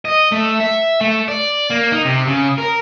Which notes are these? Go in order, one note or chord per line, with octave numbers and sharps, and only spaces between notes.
D#5
A3
E5
A3
D5
A#3
D#4
C3
C#3
A#4